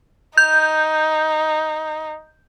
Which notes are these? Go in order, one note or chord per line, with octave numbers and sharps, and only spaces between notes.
D#4 G6